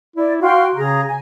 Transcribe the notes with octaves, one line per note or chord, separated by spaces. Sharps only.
E4 D5
F#4 F5 G5 C6
C#3 G#4 A#5
G#5